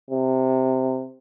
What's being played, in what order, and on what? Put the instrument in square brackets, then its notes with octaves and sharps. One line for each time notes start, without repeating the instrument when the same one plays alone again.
[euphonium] C3